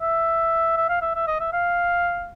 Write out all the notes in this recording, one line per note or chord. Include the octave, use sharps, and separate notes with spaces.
E5
E5
F5
E5
E5
D#5
E5
F5